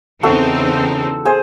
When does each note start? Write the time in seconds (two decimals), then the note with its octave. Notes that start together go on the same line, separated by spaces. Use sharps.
0.23 E2 C#3 E3 C4 D#4 F#4 A4
1.25 G#4 C5